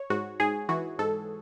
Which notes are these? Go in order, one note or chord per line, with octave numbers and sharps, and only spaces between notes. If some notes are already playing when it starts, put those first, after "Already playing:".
Already playing: C#5
G#2 F#4
G#2 G#4
E3 F#4
G#2 A4